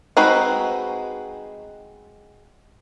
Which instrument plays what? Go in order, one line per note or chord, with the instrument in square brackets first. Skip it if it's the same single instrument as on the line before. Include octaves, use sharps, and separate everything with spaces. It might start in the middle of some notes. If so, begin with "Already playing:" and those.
[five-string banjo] G#3 C4 D#4 F#4 B4